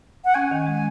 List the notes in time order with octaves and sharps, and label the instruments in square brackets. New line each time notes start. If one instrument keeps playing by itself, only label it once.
[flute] F#5
[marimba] C#4 [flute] G#5
[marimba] D#3
G#3